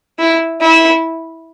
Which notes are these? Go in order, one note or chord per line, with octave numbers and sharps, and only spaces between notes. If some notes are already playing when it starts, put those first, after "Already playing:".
E4
E4